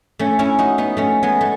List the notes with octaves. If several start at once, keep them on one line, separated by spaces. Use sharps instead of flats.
A3 C#4
C#4 E4
D#4 F#4
B3 D#4
A3 C#4
G#3 B3
A3